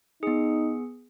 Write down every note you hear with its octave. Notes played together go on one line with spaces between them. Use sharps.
B3 D#4 G#4